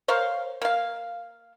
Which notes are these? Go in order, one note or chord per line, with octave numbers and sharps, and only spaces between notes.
A#4 C5 C#5 F5
A#3 F5